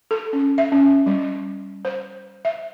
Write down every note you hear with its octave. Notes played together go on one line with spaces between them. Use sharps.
A4
C#4
E5
C#4
G3
C5
E5